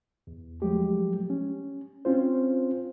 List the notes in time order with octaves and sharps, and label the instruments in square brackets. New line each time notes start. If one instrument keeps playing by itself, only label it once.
[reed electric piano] E2
F3 F#3 G#3 A3 G4
C#4
C4 C#4 F4 C5